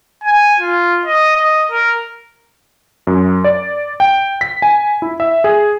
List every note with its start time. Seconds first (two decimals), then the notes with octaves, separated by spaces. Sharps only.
0.24 G#5
0.60 F4
1.06 D#5
1.37 D#5
1.72 A#4
3.07 F#2
3.44 D5
4.00 G5
4.41 B6
4.62 G#5
5.02 E4
5.20 E5
5.44 G#4